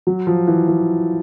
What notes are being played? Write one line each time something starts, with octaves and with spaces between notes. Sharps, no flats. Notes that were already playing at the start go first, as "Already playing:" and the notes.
F#3
F3
E3
E3